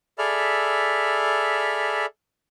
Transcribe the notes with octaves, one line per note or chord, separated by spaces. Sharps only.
G#4 A4 D5 E5 B5 F6